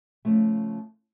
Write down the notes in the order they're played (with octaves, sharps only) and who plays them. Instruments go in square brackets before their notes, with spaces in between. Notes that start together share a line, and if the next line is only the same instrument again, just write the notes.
[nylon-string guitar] C#3 F3 A3